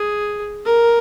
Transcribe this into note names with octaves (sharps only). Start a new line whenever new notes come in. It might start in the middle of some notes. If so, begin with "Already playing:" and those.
Already playing: G#4
A#4